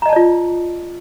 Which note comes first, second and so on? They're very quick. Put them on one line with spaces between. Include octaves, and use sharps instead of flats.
A#5 D#5 A5 D5 F4